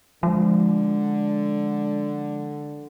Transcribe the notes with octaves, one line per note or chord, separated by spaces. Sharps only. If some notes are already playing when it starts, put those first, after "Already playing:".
D3 F3 G#3